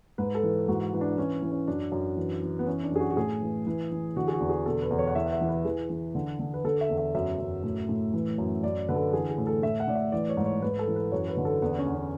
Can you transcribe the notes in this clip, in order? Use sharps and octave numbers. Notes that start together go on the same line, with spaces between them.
G#2 B4
A4
E3
G#2 F#4
E3
D4
E3 C#4
E3
C#4
F#2 D4
F#2
E3
E3
B3
E3 C#4
D4
F#2 G#4
F#4
F#4
A2 G#4
E3
E3
E3
D3 F#4
G#4
F#4
E2
G#4
B2 A4
B4
E2
C#5
F#5
E3 E5
F#5
E5
E3
B4
E3 G#4
E3
D3
D3
B4
D3 A4
E5
E2
E5
F#2 E5
F#2
A2
A2
E3
F#2
F#2 D5
D3 B4
A4
E3 G#4
G#4
A2
A4
A2 E5
F#5
A2 D5
E5
E3 D5
C#5
G#2
C#5
G#2 B4
A4
E3
B4
F#2 C#5
B4
D3
A4
E2 B3
C#4
E2
C#4